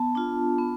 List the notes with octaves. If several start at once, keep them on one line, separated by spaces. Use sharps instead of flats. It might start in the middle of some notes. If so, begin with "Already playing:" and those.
Already playing: B3 A5
D4 F4
B3